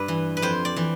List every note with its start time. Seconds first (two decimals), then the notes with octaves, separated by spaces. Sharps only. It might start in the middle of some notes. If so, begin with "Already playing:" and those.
Already playing: G2 B4
0.08 E3
0.37 B4
0.42 F2 C5
0.65 D5
0.76 E3